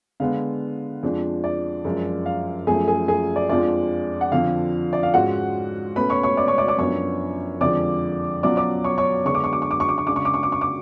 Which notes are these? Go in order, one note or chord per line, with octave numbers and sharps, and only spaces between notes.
D3 G#3 B3 F5
F2 F3 G#3 D4
D5
F#2 F3 G#3
F5
F#2 F3 A3 G#4 G#5
G#4 G#5
G#4 G#5
D5
F2 F3 G#3 D4 F4 D5
F#5
F2 D3 F3 F5
D5
F5
G#2 G#3 C#4 F4 F#4 F#5
B2 A3 C#4 B4 B5
C#5 C#6
C#5 C#6
D5 D6
C#5 C#6
D5 D6
D5 D6
F#2 F3 B3 D4 C#5 C#6
F2 D3 F3 G#3 D5 D6
B2 F#3 C#4 F4 D5 D6
D5 D6
C#5 C#6
C#5 C#6
D3 G#3 B3 D4 C#6
D6
C#6
D6
C#6
D6
C#6
D6
C#6
C#3 G#3 D4 D6
C#6
D6
C#6
D6
C#6
D6